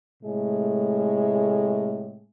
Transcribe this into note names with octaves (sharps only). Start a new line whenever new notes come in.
A2 C3 G#3 A3 G#4